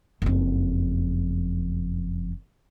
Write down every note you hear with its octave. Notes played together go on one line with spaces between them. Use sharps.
F#1 F2